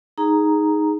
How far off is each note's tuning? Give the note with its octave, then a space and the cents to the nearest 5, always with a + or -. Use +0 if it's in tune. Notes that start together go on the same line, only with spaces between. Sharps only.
D#4 +0 G#4 +0 A#5 +0